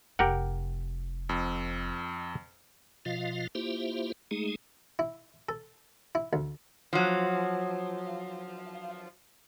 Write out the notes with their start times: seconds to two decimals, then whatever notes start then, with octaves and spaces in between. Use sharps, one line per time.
0.19 F1 G4 A#4 F#5
1.29 F2
3.05 B2 F3 F4 D#5 F5
3.55 A#3 E4 F4 G4 C5 E5
4.31 G#3 A3 D#4 G#4
4.99 E4
5.49 A4
6.15 E4
6.33 D2
6.93 F3 F#3